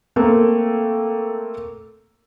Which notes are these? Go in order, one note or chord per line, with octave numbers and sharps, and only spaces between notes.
A3 A#3 C4